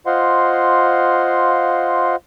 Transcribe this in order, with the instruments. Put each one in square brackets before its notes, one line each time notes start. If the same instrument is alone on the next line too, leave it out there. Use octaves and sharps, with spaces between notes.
[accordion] F4 C5 D#5 F5 F#5 C6